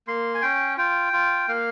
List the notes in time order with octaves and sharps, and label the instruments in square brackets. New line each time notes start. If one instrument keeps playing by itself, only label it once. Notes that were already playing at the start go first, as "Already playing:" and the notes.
[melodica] A#3 C6
G#5
C#4 G5
F4 G5
F4
A#3 F5